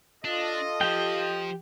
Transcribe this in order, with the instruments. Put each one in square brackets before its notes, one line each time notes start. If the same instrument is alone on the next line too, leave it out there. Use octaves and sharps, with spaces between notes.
[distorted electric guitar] D4 [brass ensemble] F4 A4 D#5
[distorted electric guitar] F3 [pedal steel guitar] G4 G5